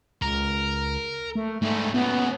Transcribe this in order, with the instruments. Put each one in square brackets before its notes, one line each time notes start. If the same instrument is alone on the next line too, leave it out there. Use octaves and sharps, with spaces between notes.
[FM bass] C#2 [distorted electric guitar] A#4
[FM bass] A3
[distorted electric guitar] G#2 G3 [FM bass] A3
[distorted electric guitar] A#2 C#3 [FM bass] B3